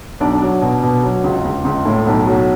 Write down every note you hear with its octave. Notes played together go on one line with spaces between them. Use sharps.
B1 D4 D5
F#3
B2
B2
F#3
C#2
C#2
C#2
A2
B1
F#3